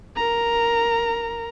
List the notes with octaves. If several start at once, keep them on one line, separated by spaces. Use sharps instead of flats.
A#4 A#5